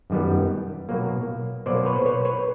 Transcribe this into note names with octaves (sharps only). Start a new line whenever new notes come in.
F#2 D#3 G3 B3
B2 F#3 A#3
B2 F#3 A#3 C5 D5
B4 C#5
C5
B4 C#5
B4 C#5